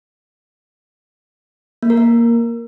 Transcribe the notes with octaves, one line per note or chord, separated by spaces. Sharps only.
A#3
A#4
A#3